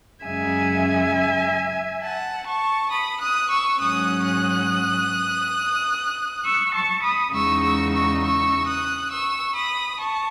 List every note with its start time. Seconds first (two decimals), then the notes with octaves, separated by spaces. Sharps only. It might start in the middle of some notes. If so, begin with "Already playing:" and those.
0.25 F#2 C#3 G#3 E5 G#5
2.01 F#5 A5
2.46 A5 C#6
2.90 B5 D#6
3.20 D#6 F#6
3.49 C#6 E6
3.79 G#2 F#3 C#4 D#6 F#6
4.23 D#6 F#6
6.45 C#6 E6
6.74 A5 C#6
7.03 B5 D#6
7.33 E2 C#3 G#3 D#4 C#6 E6
7.62 C#6 E6
7.92 C#6 E6
8.21 C#6 E6
8.66 D#6 F#6
9.10 C#6 E6
9.54 B5 D#6
9.99 A5 C#6